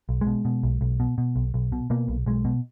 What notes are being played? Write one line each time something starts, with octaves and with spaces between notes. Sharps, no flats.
B1
G#3
B2
B2
B1
B1
B2
B2
B1
B1
B2
B2 A#3
B1
B1 G#3
B2